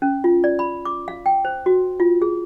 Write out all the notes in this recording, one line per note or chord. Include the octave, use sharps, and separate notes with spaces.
C#4
F4
D5
B5
D6
F5
G5
C5
F#4
F4
G#4